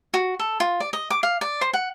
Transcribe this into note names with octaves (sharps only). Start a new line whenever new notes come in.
F#4
A4
F4
D5
D#5
D6
F5
D5
C5
F#5